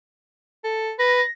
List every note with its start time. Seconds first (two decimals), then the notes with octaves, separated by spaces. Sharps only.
0.64 A4
0.99 B4 A#6